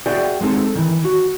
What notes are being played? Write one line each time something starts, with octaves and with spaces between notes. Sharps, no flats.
F#4 G#4 D5 E5 F#5 G5
G#3 C4 D#4 A4
D#3 E3
F#4